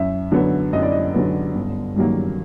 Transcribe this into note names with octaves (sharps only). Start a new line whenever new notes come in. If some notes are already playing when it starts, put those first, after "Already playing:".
Already playing: F#2 E5
D3 F#3 B3
F#2 D#5
D5
D#5
D3 F#3 B3
G1
G2 D#3 F#3 A#3